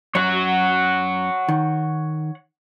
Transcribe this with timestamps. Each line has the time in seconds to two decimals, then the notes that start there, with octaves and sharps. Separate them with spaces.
0.15 F#2 C#5 F#5
1.49 D#3